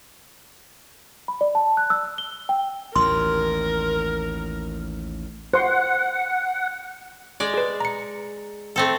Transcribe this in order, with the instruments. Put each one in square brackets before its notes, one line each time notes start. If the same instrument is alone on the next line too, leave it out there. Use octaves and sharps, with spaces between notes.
[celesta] B5
D5
A5
F#6
E6
G7
G5
[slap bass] A1 D#2 [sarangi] A#4 [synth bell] C6
[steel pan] C5 C6 [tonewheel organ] F#5
[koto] G#3 D5
[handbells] G#4 B4
A#5 C#7
[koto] A3 C4 A4